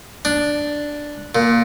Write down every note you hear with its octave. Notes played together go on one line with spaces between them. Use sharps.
D4
A#2